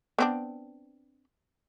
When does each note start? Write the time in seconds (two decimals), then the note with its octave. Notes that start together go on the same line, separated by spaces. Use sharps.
0.18 B3 C4 D4